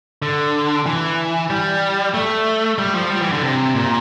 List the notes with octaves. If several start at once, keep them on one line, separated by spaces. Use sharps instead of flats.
D3
E3
G3
A3
G3
F3
G3
E3
D3
C3
A#2